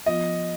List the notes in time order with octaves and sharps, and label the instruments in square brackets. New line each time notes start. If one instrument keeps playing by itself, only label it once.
[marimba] F3 B3 F4 [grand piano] D#5